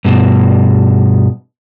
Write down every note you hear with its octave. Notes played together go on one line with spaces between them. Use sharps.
G2 B2